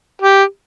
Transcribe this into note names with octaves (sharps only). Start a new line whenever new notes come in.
G4